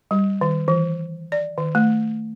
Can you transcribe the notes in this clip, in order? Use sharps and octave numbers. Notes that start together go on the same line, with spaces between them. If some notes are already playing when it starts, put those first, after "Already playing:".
G3
D#3
E3
D5
D#3
A3